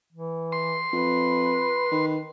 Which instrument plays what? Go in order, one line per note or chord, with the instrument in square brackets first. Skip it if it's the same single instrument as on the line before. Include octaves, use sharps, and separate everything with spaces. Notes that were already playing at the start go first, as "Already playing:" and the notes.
[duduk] E3
[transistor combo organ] C6
[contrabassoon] F2 [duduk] B4
[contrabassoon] D#3